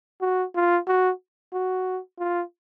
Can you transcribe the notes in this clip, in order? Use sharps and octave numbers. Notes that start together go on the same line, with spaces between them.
F#4
F4
F#4
F#4
F4